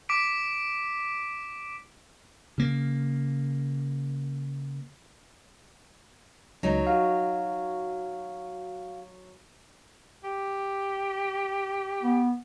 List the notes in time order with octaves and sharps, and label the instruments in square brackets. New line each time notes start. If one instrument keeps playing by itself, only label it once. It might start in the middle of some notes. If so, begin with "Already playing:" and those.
[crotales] D6 B6 D7
[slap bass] C#3 A#3
[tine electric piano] C#2 [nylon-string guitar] F#3 D#4
[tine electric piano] F#4 F5
[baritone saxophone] G4
[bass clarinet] B3